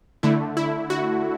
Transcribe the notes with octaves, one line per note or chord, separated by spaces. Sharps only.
D3 A3 E4
E4
F#4